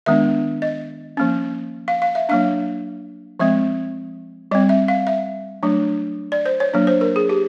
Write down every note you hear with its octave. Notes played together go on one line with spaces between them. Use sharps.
D#3 G#3 B3 D4 E5
D#5
F3 A#3 C#4
F5
F5
E5
F#3 A#3 D4 F5
F3 G#3 C4 E5
G3 C4 D#5
E5
F5
E5
F#3 A3 D4
D5
C5
C#5
F#3 A#3 D4
C5
A#4
G#4
G4